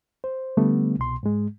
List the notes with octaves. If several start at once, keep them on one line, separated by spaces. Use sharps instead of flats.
C5
D3 G3 A3 B3
C2 B2 C6
G#2 G#3